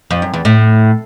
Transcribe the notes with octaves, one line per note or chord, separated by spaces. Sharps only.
F2
F#2
E2
A2